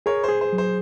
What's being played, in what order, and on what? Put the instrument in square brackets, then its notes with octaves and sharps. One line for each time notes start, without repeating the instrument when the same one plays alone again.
[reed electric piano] G#4 [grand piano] A#4 C#5
[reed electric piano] G#4 [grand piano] C5
[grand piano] C5
[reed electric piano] F#3
[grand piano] C5